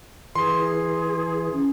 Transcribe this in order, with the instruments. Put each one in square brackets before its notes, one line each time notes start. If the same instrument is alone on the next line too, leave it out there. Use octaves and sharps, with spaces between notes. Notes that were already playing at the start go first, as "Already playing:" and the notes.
[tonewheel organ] E3 [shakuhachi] G#4 [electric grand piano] C6
[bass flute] C#4